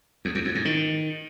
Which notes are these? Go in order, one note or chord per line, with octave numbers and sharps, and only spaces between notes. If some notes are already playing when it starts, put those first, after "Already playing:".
E2
E2
F2
G#2
D#3